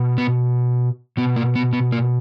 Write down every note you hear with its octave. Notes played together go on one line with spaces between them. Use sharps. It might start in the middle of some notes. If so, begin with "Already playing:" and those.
Already playing: B2
B3
B2 B3
A#3
B3
B3
A#3